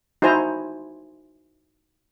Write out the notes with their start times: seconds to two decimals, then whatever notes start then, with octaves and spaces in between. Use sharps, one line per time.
0.22 D#4 E4 F#4 C5 G#5 A#5